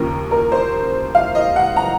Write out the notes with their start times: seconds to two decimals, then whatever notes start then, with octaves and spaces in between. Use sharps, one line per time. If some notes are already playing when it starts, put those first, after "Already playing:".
Already playing: D#2 C#3 F3 A#4
0.31 A#4
0.52 C5
1.15 F5
1.35 D#5
1.56 F#5
1.76 A#5